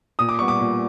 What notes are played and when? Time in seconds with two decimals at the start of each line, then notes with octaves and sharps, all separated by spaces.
0.19 A#2 D#6
0.29 D6
0.39 G3 B3 C#6
0.48 D6
0.60 A#2